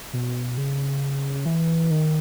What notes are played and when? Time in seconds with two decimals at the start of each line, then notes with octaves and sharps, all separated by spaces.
0.13 B2
0.57 C#3
1.45 E3
1.90 D#3